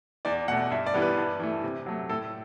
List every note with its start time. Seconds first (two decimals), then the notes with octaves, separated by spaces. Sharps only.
0.25 E2 D5
0.48 B2 F#5
0.51 A3
0.71 G2 E5
0.86 D5
0.94 E3 G3 B3
1.02 B4
1.17 G2
1.40 E3 A3
1.64 C3
1.86 F#3 A3
2.09 A2 A4